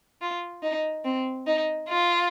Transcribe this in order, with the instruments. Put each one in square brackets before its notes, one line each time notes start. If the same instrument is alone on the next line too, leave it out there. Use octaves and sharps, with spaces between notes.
[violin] F4
D#4
C4
D#4
F4